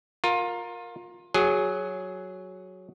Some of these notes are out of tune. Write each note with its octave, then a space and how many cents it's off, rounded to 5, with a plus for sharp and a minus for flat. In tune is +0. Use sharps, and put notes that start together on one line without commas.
F4 +25 A#4 +0
F#3 +0 G#4 +0